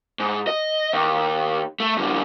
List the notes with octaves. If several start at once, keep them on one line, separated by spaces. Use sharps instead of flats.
G#2
D#5
D#2
A3
F#2 D3